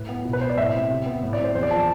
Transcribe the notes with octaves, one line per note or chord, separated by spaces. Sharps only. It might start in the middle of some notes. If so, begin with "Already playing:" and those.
Already playing: A2 B4
B3
B2
B4
B3 C5
D5
A2 E5
C4
C3
B3
A2
D5
C4
C5
E2 C5
D5
F3 A5